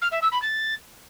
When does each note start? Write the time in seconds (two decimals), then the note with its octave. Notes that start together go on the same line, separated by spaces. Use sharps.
0.01 F6
0.11 E5
0.22 E6
0.32 B5
0.42 A6